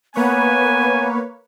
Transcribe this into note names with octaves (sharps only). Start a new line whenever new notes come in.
A#3 B3 B4 C#5 G#5